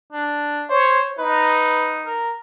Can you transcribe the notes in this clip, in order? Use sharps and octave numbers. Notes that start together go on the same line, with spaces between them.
D4
C5 C#5
D#4 B4
A#4